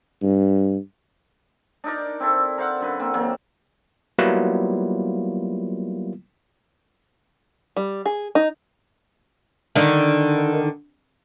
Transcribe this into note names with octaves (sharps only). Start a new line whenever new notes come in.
G2
D4 D#4 A#4 D5
C4 E4 A4
A#4 C5 F5 F#5
F#2 D3 B4
A#3 C4
C3 E3 F#3 A#3
F#3 G3 A#3 B3 E4 F4
G3
G#4
D#4
D3 D#3